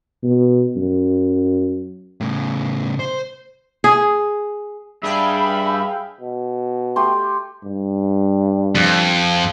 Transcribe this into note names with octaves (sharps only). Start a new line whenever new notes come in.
B2
F#2
A2 C#3
C5
G#4
G2 D4 G#4 E5 F5 G5 B5
B2
A3 G4 C6
G2
F2